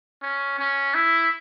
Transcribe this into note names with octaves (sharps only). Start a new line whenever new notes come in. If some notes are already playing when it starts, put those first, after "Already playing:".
C#4
C#4
E4